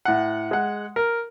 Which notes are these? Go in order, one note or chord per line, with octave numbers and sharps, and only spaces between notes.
A2 F#5
G#3 F#5
A#4